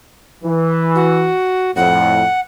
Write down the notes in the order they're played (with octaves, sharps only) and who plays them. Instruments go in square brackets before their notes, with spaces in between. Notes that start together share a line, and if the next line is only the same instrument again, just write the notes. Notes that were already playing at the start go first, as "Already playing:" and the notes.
[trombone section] E3
[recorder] F#4
[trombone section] F2 A2 [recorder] F#5